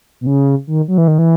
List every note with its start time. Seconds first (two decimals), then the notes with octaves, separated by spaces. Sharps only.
0.21 B2
0.27 C#3
0.67 D#3
0.88 F#3
0.98 E3
1.08 D#3
1.19 E3